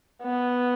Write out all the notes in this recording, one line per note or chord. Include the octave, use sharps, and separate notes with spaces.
B3